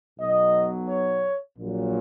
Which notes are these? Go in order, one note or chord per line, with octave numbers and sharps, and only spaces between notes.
B1 B2 F#3 D#5
C#5
A#1 A#2 F#3